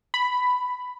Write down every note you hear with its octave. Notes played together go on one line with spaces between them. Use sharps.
B5